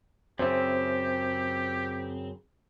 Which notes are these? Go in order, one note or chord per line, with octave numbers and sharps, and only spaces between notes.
F#2 C#3 C4 G4 C5 E5